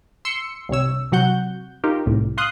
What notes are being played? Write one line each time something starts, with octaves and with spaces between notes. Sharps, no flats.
C6 E6 C#7
C2 G2 C3 C#5 E6
C3 F#3 F#4 F#5 G6
D#4 F4 G4 A#4
C2 A2
F5 C6 D#6 F#6